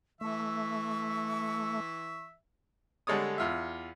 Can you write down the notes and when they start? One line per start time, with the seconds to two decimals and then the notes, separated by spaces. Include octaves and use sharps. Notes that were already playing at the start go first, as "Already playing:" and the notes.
0.21 E3 A3 E5 C#6
3.07 D3 G3 G#3 A4 C#5 D#6
3.38 E2 F4 E5